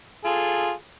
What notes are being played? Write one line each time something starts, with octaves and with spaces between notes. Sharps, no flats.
F4 G#4 A4